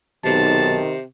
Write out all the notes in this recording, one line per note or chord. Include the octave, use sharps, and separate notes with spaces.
B1 C3 D#3 A5